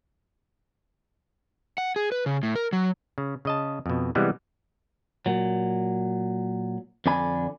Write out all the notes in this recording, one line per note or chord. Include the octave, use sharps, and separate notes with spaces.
F#5
G#4
B4
C#3
A2
A#4
F#3
C#3
C#3 D#5 A5
F2 B2
C3 E3 G3 G#3 B3
A#2 F#3
F2 D3 D4 D5 G#5 B5